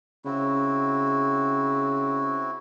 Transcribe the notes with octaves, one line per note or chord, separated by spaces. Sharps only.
C#3 C4 E4 F#4